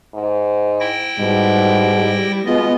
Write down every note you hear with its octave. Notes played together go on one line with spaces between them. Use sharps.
G#2
E4 G5 A#6
G#2 B2 G3
B2 G#3 B3 F4 D#5